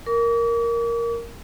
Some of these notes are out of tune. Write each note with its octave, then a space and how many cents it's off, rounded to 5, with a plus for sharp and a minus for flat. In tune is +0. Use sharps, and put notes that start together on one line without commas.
A#4 +0 D6 -45